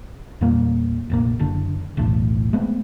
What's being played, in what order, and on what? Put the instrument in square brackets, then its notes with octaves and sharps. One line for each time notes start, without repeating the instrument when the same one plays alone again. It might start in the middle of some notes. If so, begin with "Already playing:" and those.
[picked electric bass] E2 A#2 G3 A#3
F1 A#1 A#3
F#1 D3
B1 E2 A2
G#3 A3 B3 C4